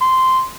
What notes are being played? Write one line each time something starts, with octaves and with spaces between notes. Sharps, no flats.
C6